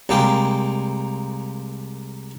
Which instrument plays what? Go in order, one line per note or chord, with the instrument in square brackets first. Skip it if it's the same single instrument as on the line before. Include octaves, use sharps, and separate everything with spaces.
[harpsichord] C2 G#3 A#3 G4